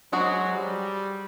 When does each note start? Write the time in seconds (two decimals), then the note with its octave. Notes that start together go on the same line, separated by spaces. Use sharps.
0.13 F#3 G#3 F#4 C5
0.54 G3